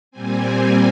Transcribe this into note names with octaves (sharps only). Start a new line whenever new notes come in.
A#2 G3 C4 G#5